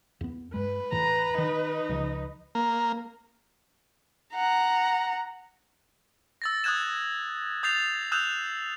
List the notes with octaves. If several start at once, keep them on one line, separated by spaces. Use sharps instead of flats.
E2 B3
G2 G#3 B4
E2 A2 E3 A#5
D#3 D#4
C#2 C#3 F3
A#3
F#5 A#5
E6 A6 A#6
D#6 E6 F#6 G#6 E7
D#6 G6 A6 C7 F7
D#6 E6 F#6 G6 E7 F7